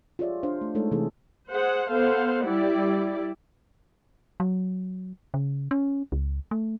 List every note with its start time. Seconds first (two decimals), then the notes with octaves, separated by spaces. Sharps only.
0.19 F4 G4 G#4 C#5 D5 E5
0.43 D4 C5 F5
0.61 A3
0.75 G#3 A3 D#4 A4 C#5
0.91 C3 E3 A3 D#4 G#4 A4
1.50 G#4 C5 F#5
1.89 B3 A4 C5 F5 F#5
2.44 G3 E4 G4 D5
4.40 F#3
5.34 C#3
5.71 C#4
6.12 C#2
6.51 A3